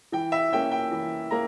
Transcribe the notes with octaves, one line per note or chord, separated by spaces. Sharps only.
E3 G5
E5
A#3 C#4 G5
G5
E3
A#3 A#5